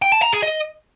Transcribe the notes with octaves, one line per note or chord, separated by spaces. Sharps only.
G5
A5
A#5
G#4
D#5